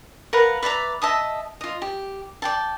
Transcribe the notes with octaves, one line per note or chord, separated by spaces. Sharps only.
A#4 B4 F5 F#5
B4 D5 E5 A#5
D#5 E5 A5 D#6
F4 D#5
G4
D5 G5 A5